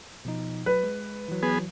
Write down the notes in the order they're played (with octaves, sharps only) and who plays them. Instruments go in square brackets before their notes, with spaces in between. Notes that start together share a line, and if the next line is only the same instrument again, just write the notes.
[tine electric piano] B2 F3 D#4
[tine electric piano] F#3 [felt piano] B4
[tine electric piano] G#3
E3 F#3
[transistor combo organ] B3 G#4